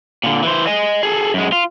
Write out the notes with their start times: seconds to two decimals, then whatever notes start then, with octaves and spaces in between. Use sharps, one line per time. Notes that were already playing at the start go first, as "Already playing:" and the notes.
0.24 A#2 D3
0.43 E3 C5
0.67 D#5 G#5
1.03 G#4 A4
1.34 F#2 G#3
1.52 F4